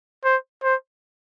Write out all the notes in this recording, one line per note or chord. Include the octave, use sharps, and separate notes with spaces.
C5
C5